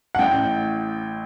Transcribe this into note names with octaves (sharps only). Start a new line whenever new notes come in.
F#5
A1 A2 G5